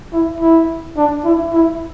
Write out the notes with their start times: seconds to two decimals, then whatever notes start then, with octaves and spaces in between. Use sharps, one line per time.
0.13 E4
0.41 E4
0.97 D4
1.25 E4
1.53 E4